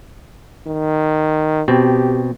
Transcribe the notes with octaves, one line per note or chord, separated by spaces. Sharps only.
D#3
B2 C4 G4